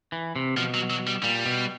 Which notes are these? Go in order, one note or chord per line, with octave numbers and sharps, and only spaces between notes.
E3
C3
B2 F3
F#3
F#3
G3
A#2 G3
B2